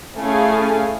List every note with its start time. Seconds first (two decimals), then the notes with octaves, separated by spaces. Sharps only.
0.18 A3 C#4 E4 G#4 F5 G#5